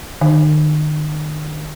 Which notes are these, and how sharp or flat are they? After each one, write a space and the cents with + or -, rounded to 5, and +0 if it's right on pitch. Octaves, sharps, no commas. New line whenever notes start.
D#3 -40